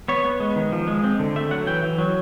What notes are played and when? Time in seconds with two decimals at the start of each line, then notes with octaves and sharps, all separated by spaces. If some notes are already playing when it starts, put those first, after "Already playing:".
0.08 B3 C#5
0.24 B3
0.40 G#3
0.56 D#3
0.72 F3
0.88 G#3
1.04 C4
1.19 D3
1.36 A3 E5
1.51 F#3 F#5
1.67 E3 G5
1.83 E3
1.98 F#3